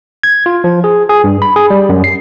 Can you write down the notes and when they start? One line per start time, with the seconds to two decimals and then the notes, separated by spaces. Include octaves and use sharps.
0.23 G#6
0.46 F4
0.64 F3
0.84 G#4
1.09 G#4
1.24 G2
1.42 B5
1.56 G#4
1.70 G3
1.89 F#2
2.04 C7